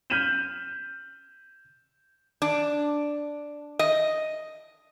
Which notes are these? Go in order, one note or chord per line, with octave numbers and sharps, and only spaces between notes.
F6 G6 B6 D#7 E7 F#7
D4
D#5